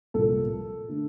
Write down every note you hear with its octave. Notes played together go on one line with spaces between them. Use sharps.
C2 A#2 F3 A#3 A4
D3 A3